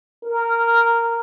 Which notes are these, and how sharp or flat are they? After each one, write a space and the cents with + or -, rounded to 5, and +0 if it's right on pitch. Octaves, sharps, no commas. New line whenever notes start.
A#4 -10